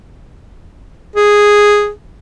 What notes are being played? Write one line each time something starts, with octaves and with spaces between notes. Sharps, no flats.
G#4